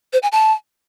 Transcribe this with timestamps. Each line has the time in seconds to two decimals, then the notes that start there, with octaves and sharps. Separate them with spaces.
0.13 C5
0.23 G#5
0.32 A5